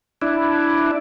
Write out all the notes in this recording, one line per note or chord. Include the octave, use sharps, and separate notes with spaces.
D4 E4